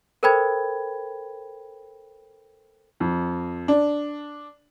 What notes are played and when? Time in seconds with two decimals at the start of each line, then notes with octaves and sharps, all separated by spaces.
0.23 A4 A#4 C5 G5 B5 G#6
3.00 F2
3.68 D4